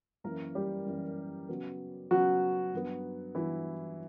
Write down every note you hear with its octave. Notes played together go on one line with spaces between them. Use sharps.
F#2 E3 A#3 A#4
G3 G4
F#2 E3 A#3
C#3 F#3 B3
C#3 F#3 B3 F#4
G2 F#3 B3
G2 E3 F#3 B3 E4